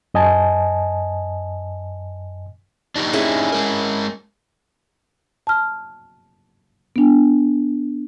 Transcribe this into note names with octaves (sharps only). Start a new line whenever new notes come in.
F#2 D#5 G#5 A5
D4 D#4 G4
C#4 E4 G#4
G#3 A#4
A5 F6
B3 D4